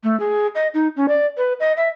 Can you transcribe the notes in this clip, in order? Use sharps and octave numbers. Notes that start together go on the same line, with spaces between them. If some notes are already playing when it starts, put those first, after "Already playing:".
A3
G#4
D#5
D#4
C#4
D5
B4
D#5
E5